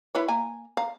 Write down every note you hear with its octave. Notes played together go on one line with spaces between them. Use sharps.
E4 B4 C#5
A#3 G#5 A#5
F5 A#5